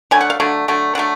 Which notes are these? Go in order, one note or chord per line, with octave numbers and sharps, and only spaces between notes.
D3 F#3 A3 G#5
F#5
F5
D3 F#3 A3
D3 F#3 A3
D3 F#3 A3 F#5